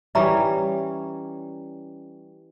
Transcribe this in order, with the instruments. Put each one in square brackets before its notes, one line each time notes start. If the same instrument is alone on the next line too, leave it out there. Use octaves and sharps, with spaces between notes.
[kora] E3 G3 C#4 [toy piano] E5 A#5